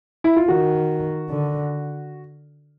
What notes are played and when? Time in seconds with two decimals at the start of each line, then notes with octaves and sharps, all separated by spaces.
0.24 E4
0.36 F4
0.48 D#3 F#4
1.30 D3